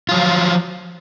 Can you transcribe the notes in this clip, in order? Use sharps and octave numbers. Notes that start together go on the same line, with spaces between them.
F3 F#3 F4